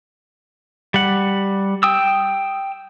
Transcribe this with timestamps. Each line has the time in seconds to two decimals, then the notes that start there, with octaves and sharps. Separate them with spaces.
0.94 G3 F#5
1.83 G5 D#6 E6